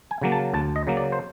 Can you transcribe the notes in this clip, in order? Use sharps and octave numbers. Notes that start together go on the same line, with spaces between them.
G#5
C#3 F#3 A#3
A5
D2 A5
D#5
C#3 F#3 A#3
D5
C5